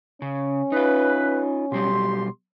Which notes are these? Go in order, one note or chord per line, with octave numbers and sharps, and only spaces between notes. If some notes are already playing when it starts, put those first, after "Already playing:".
C#3 C#4
D#4 F4 B4
B2 F#3 G3 G4 C6